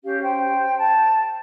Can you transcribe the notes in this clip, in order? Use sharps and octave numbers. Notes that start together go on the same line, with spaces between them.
C#4 G4 F5
C5 G5
A5